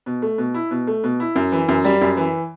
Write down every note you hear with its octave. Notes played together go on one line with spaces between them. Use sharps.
B2
A3
B2
E4
B2
A3
B2
E4
F#2
E3
F#2
G3
F#2
E3